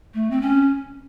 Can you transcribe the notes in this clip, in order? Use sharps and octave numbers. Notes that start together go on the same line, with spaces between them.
A3
C4
C#4